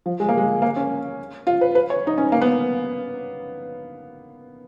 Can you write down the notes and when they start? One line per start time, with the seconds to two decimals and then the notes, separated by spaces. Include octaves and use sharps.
0.06 F3
0.20 G#3
0.29 A#3
0.37 G#3
0.62 A#3
0.76 C#4
1.47 F4
1.61 B4
1.75 B4
1.90 C#5
2.07 D#4
2.18 C#4
2.32 A#3
2.41 B3